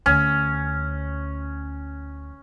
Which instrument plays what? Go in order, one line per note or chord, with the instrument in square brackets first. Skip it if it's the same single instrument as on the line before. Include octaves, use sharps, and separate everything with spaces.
[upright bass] D2 [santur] C#4